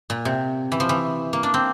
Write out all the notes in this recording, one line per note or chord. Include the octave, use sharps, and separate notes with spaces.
A#2
C3
E3
F3
E3
A#3
D4
C4